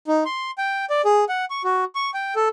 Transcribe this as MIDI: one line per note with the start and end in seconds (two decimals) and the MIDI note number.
0.07 0.24 63
0.25 0.51 84
0.58 0.85 79
0.90 1.02 74
1.05 1.25 68
1.29 1.45 78
1.50 1.62 85
1.64 1.84 66
1.95 2.11 85
2.14 2.34 79
2.36 2.48 69